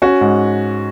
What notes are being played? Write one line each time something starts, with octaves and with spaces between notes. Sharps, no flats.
C#4 F#4
G#2